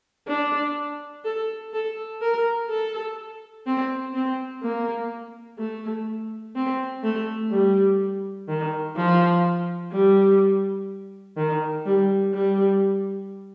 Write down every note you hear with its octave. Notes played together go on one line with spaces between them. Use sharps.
D4
A4
A4
A#4
A4
C4
C4
A#3
A3
C4
A3
G3
D#3
F3
G3
D#3
G3
G3